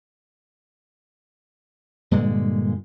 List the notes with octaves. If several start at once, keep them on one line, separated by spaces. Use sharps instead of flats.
G2 A#2 D3 G#3